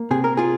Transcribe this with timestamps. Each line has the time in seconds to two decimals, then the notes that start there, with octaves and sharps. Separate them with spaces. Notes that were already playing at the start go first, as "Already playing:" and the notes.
Already playing: A#3
0.11 C3 G#4
0.24 A#4
0.37 F4 G#4